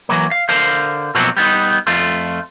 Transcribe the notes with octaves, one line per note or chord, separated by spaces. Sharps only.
E3 F#3 A#3
F5
D3 A#4 C5 F5
B2 F3 F#3 A#3 C4 F#4
G3 B3 D#4
F2 A3 F4